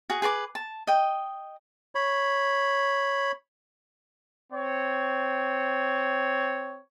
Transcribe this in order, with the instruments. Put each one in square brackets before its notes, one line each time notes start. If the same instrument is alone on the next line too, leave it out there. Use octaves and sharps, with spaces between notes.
[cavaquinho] F#4 G#4
G#4 B4 A5 D6
A5
D#5 G5
[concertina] C#5 B5
[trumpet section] C4 C#5